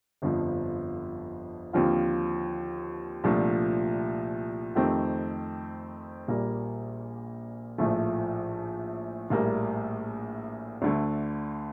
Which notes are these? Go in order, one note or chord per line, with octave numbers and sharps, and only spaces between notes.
G1 F2 D3 F3
D#2 D3 F3 C4 F4
C2 A#2 F3 A3 D4
F2 D#3 A3 C4 G4
A#1 A#2 G3 A#3
A#1 A2 F3 A3
A#1 A2 G3 A#3
D2 D3 A3